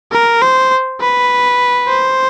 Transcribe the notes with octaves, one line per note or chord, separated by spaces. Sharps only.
A#4
C5
B4
C5